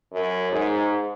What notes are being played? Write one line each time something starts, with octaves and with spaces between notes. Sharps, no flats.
F#2
G#2